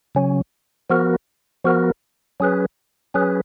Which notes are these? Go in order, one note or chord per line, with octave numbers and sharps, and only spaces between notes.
C#3 F#3 C#4
F3 B3 F#4 A#4
F3 B3 F#4 A#4
F#3 C#4 G#4 B4
F#3 C#4 G#4 B4